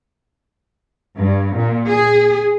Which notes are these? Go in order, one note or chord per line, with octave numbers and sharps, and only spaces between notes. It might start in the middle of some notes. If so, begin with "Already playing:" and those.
G2
A#2
G#4